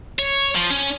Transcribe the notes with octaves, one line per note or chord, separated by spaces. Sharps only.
C#5
F3
C#4